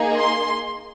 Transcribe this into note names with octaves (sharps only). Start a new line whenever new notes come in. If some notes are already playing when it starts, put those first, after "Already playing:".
Already playing: A#3 D#4 G#4
C6